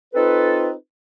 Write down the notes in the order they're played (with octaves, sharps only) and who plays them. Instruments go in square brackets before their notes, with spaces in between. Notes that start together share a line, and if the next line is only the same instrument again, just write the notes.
[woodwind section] C4 D#4 F4 A4 B4